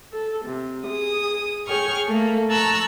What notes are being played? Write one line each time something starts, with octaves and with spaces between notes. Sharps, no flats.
A4
C3
G#4 D#6
G#4 C#5 G5 C#6 F6
A3 A#3 A4
A5 A#5 C#6 E6 F#6